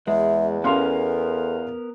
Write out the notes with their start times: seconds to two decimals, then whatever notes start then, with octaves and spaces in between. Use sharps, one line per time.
0.08 E2 G#3 E5
0.64 B3 C#4 A4 A#4 F5 C6